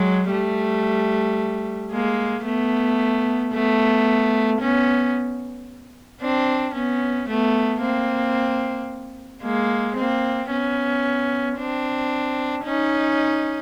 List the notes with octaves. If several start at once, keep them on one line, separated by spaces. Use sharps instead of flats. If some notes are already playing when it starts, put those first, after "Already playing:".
Already playing: F#3 G#3
G3 A3
G#3 A#3
A3 B3
A3 B3
B3 C#4
C4 D4
B3 C#4
A3 B3
A#3 C4
G#3 A#3
A#3 C4
B3 C#4
C4 D4
C#4 D#4